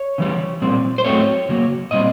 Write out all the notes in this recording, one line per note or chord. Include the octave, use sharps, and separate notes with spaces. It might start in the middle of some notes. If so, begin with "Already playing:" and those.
Already playing: C#5
C#3 E3 G3
A#2 G3 C4
C5
A2 F#3 A3 C4 C#5
C#3 F#3 A#3
A#2 G3 C4 D#5